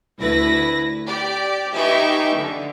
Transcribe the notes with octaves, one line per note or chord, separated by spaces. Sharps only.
D2 E4 B4 A#6
G4 D5
D#4 G4 B4 E5 G#5 C#6
D3